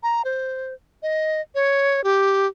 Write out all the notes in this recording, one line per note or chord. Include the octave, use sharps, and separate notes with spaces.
A#5
C5
D#5
C#5
G4